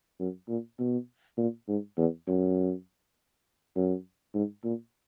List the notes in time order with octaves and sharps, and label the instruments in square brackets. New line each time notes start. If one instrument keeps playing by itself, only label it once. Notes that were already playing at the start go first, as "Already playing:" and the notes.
[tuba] F#2
A#2
B2
A#2
G#2
E2
F#2
F#2
G#2
A#2